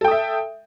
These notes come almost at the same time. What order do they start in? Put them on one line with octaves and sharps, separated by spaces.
A4 G5 D#6 E5